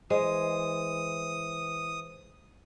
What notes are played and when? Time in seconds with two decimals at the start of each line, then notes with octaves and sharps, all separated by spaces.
0.10 E3 G#3 C5 D#6